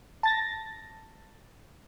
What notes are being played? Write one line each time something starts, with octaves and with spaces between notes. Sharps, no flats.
A5 A6 A#6